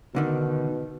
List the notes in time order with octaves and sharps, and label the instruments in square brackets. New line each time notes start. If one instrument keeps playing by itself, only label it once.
[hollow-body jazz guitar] D2 D3 D#3 [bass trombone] B2